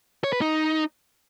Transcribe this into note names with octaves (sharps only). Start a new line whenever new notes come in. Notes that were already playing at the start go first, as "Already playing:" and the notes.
C#5
B4
D#4